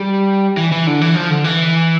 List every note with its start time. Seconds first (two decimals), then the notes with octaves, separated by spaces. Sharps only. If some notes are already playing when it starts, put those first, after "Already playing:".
Already playing: G3
0.57 E3
0.72 E3
0.87 D3
1.01 E3
1.15 F3
1.30 D3
1.44 E3